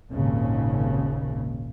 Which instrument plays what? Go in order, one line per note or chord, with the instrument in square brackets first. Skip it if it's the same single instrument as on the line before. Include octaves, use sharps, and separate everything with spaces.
[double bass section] G#1 D#2 A#2 C#3